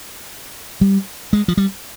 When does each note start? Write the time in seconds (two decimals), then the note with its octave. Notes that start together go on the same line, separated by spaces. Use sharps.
0.81 G3
1.33 G#3
1.48 F3
1.57 G3